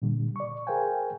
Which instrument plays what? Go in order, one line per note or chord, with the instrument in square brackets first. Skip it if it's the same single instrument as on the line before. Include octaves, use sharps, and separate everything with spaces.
[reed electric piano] A#2 D3 G3
D5 C#6
G#4 A#4 C5 F5 G5 G#5